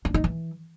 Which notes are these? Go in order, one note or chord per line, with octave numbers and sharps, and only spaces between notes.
D4
D#4
E3